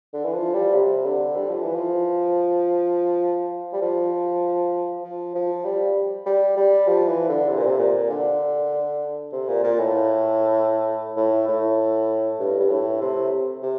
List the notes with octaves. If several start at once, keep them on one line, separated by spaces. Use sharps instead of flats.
D3
E3
F3
G3
C3
D3
G3
F3
E3
F3
G3
F3
F3
F3
G3
G3
G3
F3
E3
D3
C3
A#2
C3
A#2
D3
C3
A#2
A#2
A2
A2
A2
G2
G2
A2
C3
C3